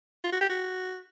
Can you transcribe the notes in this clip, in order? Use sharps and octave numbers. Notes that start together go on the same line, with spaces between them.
F4
F#4
G4
F#4